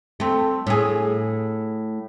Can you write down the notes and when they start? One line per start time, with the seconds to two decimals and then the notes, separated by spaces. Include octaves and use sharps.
0.20 A3 C4
0.67 A2 G#4